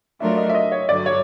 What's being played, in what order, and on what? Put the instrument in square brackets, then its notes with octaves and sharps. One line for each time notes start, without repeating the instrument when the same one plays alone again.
[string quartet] F#3 A3 D4 F4 A#4 [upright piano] E5
[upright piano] D#5
E5
D#5
C#5
[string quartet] G2 D3 F#3 [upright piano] D5
[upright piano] C#5